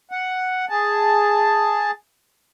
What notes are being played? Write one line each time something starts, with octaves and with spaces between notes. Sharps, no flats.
F#5
G#4 A5